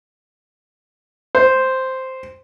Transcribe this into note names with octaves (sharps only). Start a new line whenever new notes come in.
C5